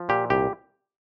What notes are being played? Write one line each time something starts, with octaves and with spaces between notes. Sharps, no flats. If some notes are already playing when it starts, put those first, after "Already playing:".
Already playing: F3
A#2 G4
C2 G4